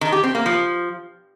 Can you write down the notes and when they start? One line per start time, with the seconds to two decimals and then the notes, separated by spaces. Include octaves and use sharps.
0.01 D#3
0.12 G4
0.24 C4
0.35 A#3
0.46 F3